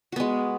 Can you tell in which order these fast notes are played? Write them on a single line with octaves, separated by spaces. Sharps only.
F#4 B3 G#3